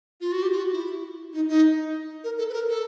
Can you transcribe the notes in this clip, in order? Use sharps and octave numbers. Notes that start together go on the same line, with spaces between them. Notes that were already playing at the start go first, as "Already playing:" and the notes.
F4
F#4
G4
F4
F#4
E4
D#4
D#4
A#4
A4
B4
A#4
A4